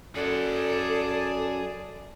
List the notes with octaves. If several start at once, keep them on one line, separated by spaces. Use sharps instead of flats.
F#2 G#4 A4 D5 F#5 A5